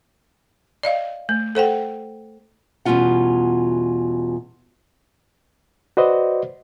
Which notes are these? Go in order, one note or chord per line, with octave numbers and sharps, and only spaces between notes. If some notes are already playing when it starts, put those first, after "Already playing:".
D5 D#5 F5
A3
A4 C5 F#5 G5
E2 B2 G3 C#4 F4 F#5
F#4 B4 C5 D5 D#5